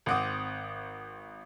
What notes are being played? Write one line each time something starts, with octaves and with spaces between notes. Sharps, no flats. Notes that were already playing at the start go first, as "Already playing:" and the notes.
G#1 C4 F#5 D6 D#6